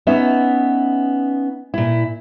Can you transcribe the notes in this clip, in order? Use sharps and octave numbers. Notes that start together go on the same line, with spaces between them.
B3 C#4 D#4 E5
A#2 E4